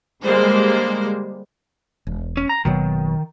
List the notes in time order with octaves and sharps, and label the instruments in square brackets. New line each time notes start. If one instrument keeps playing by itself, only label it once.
[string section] D3 G3 G#3 A#3 C5
[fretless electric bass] E1
[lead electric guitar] C#4
A#5
[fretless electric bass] F#1 B2 F#3 [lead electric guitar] D#3